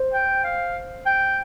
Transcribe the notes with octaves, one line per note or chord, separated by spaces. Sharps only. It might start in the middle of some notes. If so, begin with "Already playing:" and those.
Already playing: C5
G5
F5
G5